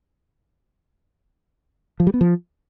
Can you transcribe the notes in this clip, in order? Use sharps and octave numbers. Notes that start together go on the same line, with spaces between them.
F3
G3
B3
F3